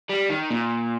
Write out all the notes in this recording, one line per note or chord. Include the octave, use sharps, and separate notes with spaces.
G3
D#3
A#2